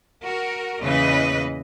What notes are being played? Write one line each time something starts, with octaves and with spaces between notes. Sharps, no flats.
F#4 A#4
E2 A#2 C#3 E3 B4 D#5